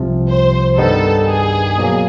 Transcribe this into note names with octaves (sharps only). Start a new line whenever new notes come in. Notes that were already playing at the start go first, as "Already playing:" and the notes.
Already playing: C2 C3 F3
C5
G2 D#3 G3 B3 D#4 A4
G#4
B2 F#3 A#3